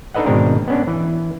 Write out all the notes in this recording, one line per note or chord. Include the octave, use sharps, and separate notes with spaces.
D4 D#4 A4 B4 D#5 F#5
G#1 B2 G#3 C4 D4 A#4
B3 C#4 D4
E3